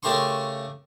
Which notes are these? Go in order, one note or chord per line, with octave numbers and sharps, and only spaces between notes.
C#3 A3 G4 A#4 C6 C#6